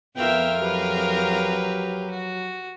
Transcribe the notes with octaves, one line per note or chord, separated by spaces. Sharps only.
F2 B3 F4 A#4 E5 G5
F#3 G4 B4
F#4